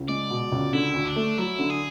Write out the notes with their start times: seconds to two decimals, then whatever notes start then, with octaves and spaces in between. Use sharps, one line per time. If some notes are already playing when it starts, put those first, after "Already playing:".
Already playing: C#2
0.08 G#3 D5
0.30 B2
0.52 C#2
0.73 D3 E4
0.94 D2
1.05 D4
1.16 A3
1.37 F#3 E4
1.59 D3
1.70 G#4